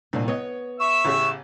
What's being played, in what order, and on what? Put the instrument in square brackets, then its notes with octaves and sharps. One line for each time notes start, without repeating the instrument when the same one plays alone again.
[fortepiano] C2 C4 [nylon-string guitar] A#2 D#3 D4
[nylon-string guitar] B3 [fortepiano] C#5 D#5
[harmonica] E5 E6 [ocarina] C#6
[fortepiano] A1 C#3 G4